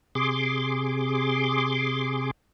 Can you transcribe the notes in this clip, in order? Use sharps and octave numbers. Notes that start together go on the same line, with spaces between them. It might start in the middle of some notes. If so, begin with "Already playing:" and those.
C3 G#4 C6 D6